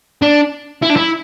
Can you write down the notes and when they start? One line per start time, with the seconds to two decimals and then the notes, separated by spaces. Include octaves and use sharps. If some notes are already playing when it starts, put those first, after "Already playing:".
0.22 D4
0.82 E4
0.90 D4
0.96 E4